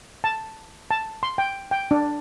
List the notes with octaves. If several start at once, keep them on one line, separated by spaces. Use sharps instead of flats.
A5
A5
C6
G5
G5
D4